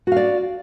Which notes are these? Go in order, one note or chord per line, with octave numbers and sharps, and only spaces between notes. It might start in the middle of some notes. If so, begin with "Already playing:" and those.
F#4 D5 F5